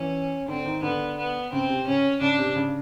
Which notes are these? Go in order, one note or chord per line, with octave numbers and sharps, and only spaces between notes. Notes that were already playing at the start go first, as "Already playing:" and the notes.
Already playing: E3 C#4
D3 C4
D#3
D3 B3
B3
C#3 C4
C3
C#3 C#4
C#3 D4
C3
C#3